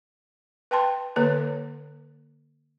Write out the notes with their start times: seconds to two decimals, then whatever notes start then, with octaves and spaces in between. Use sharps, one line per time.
0.71 B4 G5 A5 C6
1.16 D3 A#3 B4 C#5